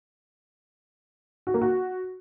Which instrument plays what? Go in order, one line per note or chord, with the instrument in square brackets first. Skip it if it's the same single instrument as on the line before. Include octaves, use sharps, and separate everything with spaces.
[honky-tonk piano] F#4
A#3
F#4